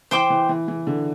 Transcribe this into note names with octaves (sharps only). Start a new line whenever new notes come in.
E3 C5 G5 D6
E3
E3
E3
D3